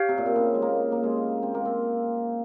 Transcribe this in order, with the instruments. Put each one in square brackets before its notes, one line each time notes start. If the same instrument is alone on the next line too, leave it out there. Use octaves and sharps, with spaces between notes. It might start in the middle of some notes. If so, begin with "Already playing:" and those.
Already playing: [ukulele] G4 C#5 F5
[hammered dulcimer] C3
A#2
C3
C#3
G#3
A#3
A#3
G#3
C4
A#3
C4